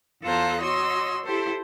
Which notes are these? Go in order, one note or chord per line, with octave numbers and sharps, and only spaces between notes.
E2 F4 A4 C5 A#5 F#6
F#4 C#5 D#5 C6 E6
E4 G4 A4 C5